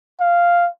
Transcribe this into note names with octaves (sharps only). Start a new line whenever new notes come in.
F5